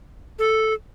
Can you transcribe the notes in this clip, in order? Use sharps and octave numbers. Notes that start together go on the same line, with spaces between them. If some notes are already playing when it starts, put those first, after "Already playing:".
A4